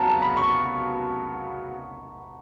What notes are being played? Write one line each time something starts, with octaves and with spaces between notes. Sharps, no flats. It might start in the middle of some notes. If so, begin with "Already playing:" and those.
Already playing: C#3 F#3 B3 A5 A#5
B5
C#6